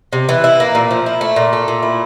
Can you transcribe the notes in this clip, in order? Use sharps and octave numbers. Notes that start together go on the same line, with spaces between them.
C3
E3
E4
A#3
A#2
F3
E4
A3
A#2
A3
A#2
E4